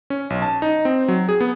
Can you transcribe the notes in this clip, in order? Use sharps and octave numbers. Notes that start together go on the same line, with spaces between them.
C#4
B1
A5
D#4
C4
F#3
G#4
B3